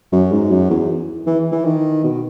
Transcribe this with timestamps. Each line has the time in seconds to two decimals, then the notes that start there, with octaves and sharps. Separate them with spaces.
0.12 F#2
0.32 G#2
0.51 F#2
0.70 E2
1.26 E3
1.52 E3
1.65 D#3
2.04 B2